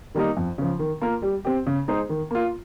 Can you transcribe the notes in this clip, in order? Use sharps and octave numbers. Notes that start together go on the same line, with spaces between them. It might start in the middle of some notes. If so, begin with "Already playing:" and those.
D#3 G3 A#3 D#4
F2
C#3 F3
D#3
A#3 F4 A#4
G3
C4 G4
C#3
G#3 D#4 G#4 C5
D#3
A#3 F4